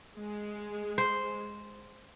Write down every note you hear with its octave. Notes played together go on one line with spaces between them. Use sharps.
G#3
C5